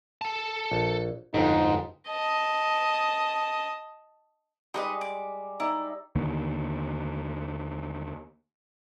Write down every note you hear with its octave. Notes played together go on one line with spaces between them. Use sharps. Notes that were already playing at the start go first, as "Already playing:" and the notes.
A4 A5
A#1
G1 F2 G#2 D#4
D#5 A5
G3 G#3 D#4 B4 D#5
D6
D#4 E4 D5
D#2 D3 D#3 A#3